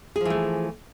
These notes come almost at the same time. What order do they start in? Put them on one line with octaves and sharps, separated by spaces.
G#4 F3 E3 A3